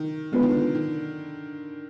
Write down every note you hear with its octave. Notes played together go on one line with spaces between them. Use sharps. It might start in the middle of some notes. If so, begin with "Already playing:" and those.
Already playing: D#3
D3 G#3 B3 F4 B4
D#3
D3
D#3